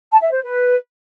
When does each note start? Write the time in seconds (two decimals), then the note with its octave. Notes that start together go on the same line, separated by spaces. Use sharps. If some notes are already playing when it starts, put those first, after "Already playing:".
0.10 A5
0.21 E5
0.32 C5
0.43 B4